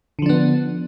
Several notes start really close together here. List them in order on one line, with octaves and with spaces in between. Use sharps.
D3 F3 D4 B3